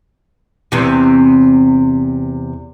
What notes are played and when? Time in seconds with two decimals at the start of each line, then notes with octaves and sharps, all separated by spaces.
0.72 E2 C3